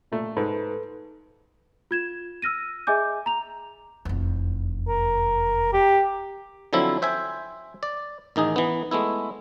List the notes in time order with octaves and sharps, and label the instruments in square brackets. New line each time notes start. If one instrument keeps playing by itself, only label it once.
[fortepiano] A#2 A3
[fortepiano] G#2 [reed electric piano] A4 B4
[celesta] F4 G#6 E7
E6 F6 A#6 D#7
G#4 D#5 E5 G#5 D6 G6
A#5 F7
[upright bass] F1 E2
[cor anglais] A#4
G4
[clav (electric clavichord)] D3 F3 F#3 C4 E4
C5 E5 G5 G#5
D5
A1 D#3 D#4 G#4
E3 B3
G#3 A3 B3 E4